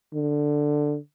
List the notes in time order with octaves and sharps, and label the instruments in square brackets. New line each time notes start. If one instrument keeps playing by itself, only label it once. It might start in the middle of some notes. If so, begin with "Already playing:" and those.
[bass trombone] D3